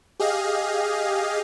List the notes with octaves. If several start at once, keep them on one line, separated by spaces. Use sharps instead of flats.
G4 G#4 D#5 F5